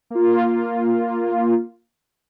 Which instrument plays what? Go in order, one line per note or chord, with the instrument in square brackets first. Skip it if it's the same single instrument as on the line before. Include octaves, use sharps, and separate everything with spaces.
[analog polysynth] A#3 F4